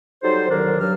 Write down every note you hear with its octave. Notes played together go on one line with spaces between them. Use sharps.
F#3 G3 D#4 A4 C5
C2 D3 D#3 F#3 D4 A#4
G2 F#3 F6